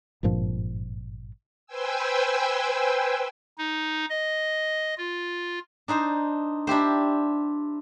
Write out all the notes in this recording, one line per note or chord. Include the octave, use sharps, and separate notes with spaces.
G#1 G2 A#2 F3
B4 C5 G5 G#5 E6
D#4
D#5
F4
D4 D#4 C5 A#5
D4 E4 G4 C5